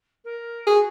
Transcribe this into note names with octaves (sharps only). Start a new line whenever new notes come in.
A#4
F#4 G#4